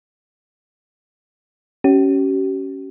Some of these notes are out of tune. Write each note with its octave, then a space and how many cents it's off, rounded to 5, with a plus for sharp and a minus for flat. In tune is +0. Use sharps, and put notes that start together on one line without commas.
C#4 +0 G4 -45